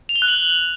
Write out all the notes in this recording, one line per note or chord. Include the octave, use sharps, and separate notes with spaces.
F7
G7
F#6
F#7